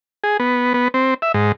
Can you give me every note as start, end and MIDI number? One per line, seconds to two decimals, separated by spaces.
0.24 0.37 68
0.40 0.74 59
0.74 0.88 59
0.94 1.14 60
1.22 1.32 76
1.34 1.52 44